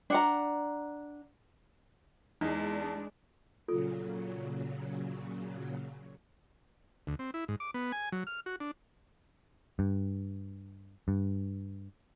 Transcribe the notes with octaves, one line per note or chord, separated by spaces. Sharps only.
D4 F#5 A#5
E2 G#3 D4 D#4
A#2 C#3 F#3 F4 A4
D2
C4
E4
G#2
D6
B3
G#5
F#3
F6
F#4
D4
G2
G2